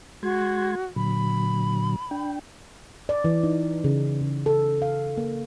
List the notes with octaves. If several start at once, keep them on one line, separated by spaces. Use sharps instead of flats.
G#3 F#4 C6 G#6
A#2 D3 F#3 B5
D4 G5
D5
E3
D#4
C#3
C#3
A4
F5
A#3